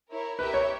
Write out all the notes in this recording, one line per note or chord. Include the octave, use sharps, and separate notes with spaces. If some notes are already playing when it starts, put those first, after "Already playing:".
E4 A#4 C#5
E4 G4 A#4 B4 E5 G5
C#5